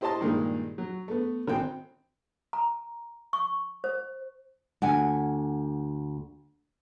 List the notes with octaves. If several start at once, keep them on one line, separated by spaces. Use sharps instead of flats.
E4 G4 C5 D#5 A5 C6
G2 A#2 D#3 G#3
F#3
A3 B3
G#1 C4 G5
A#5
C#6
C5
D2 F#5 G#5